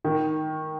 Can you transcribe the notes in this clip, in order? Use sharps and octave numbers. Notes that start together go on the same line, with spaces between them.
D#3